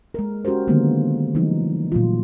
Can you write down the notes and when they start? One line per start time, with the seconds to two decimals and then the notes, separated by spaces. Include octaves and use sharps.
0.14 G#3 A#4
0.45 C#4 F#4 G4 A#4 C5
0.67 D3 D#3 F#3 G#3 A#3 B3
1.34 C#3 E3 F3 G3 A3 D#4
1.92 A#2 F#3 A3 F4